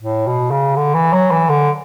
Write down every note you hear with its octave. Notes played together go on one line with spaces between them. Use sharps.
A2
B2
C#3
D3
E3
F#3
E3
D3